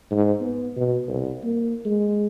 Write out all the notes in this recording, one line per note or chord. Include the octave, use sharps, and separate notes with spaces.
G#2
B3
B2
C2
A#3
G#3